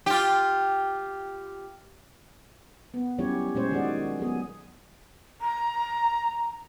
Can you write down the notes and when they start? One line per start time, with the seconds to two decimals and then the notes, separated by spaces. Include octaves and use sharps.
0.06 F4 G4
2.94 B3
3.19 F#3 G3 C#4 E4 G4 C#5
3.55 A#2 G#3 C#4 C5 C#5
3.71 D#3 G#3 F#4 G#4 D5
4.19 F#3 B3 G#4
5.41 A#5